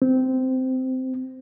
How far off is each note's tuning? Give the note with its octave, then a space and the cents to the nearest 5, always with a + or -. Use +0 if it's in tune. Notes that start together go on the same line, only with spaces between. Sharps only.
C4 -15